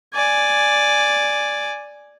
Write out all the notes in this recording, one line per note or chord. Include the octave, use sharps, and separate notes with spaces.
D5 G#5